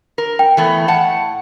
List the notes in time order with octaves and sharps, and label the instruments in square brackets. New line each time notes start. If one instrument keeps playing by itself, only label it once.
[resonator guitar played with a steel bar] A#4
[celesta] G5
[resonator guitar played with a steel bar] E3 A3 B3
A2 F#5 A5